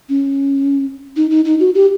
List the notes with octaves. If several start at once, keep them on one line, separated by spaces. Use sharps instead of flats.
C#4
D#4
D#4
D#4
F#4
G4